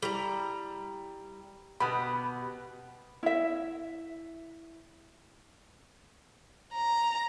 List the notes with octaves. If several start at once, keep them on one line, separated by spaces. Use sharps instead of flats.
G3 E4 A#5
B2 B3 G4 B5
E4 E5
A#5